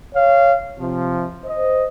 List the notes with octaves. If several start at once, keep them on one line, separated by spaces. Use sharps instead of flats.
C#5 F5
C3 F3
C5 D#5